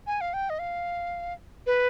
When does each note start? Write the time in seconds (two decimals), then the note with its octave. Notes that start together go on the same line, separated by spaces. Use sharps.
0.07 G#5
0.21 F5
0.34 G5
0.50 D#5
0.59 F5
1.66 B4